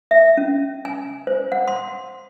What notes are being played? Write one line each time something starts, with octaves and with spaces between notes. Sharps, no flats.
E5
C#4
G#5
C5
F#5
C6